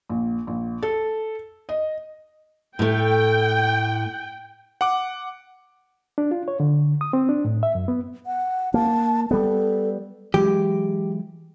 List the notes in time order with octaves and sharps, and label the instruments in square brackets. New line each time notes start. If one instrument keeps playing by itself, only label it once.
[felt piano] A#1
A#1
A4
D#5
[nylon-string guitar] A2 A3 [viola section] G5
[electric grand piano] F#5 D6
[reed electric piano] D4
F4
C#5
D3
D#6
C4
D4
A2
E5
F#2
B3
[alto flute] F#5
[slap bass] A#3 [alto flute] A5
[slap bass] G3 B3 [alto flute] A4
[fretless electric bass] E3 F#3 G#3 [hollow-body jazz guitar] G4